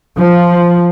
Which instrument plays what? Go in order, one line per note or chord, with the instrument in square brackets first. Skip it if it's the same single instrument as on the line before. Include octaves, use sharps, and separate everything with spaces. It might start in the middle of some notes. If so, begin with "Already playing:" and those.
[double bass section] F3